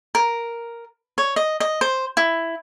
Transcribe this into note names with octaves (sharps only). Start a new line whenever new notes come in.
A#4
C#5
D#5
D#5
C5
E4